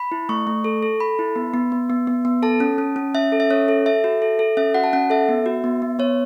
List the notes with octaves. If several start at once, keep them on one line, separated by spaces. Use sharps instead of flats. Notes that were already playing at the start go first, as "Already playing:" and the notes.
Already playing: B5
E4
A3 C#6
A3
A4
A4
A4 B5
E4
B3
B3
B3
B3
B3
B3
A4 A5
C#4
C#4
C#4
C#4 E5
A4
E5
C#4 C#5
A4
A4 E5
F#4
A4
A4
C#4 E5
F#4 F#5
A5
C#4 F#5
A4 E5
B3
F#4
B3
B3
B3 C#5